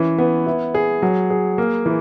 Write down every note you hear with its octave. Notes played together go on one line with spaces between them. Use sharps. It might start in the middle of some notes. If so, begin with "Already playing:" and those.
Already playing: E3 C#4
B3
E4
G#4
F#3
G#4
A#3
E3